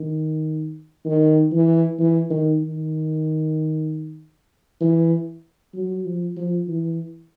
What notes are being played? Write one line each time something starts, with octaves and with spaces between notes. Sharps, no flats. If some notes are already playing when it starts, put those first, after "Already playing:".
Already playing: D#3
D#3
E3
E3
D#3
D#3
E3
F#3
F3
F3
E3